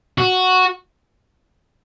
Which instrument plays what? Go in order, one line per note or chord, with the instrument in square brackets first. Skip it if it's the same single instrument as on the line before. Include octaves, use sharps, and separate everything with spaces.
[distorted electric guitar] F#4